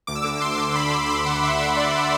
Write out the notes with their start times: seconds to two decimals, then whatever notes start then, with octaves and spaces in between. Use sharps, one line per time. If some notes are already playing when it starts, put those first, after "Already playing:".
0.07 D2 D6
0.15 E6
0.22 D3 D6
0.41 D2 C6
0.58 D3
0.75 D2 B5
0.92 D3
1.08 D2 D6
1.25 D3 F#5
1.43 D2 E5
1.50 F#5
1.59 D3 E5
1.76 D2 D5
1.93 D3